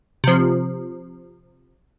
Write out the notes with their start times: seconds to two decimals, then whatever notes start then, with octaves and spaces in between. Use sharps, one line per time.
0.24 C3 F3